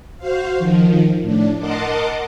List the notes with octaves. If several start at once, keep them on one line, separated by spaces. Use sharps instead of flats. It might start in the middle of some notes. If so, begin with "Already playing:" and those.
F#4 C5 F5
D#3 F3
A2 D4
A#4 D#5 F#5 A5 C6 D6